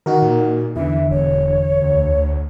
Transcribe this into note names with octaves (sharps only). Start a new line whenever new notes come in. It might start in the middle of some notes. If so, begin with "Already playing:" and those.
D#3 D#4 F#4 A#4
A#2
E2 D3 E3 E5
E1 C#5
D2